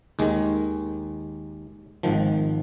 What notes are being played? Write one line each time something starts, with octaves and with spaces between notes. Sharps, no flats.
D#2 D#3 G#3
G#1 G#2 D#3 F3